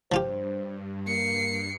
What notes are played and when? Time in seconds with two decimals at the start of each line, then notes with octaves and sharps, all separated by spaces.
0.12 G2 F3 F4 G4 C5
1.07 A#3 C7 C#7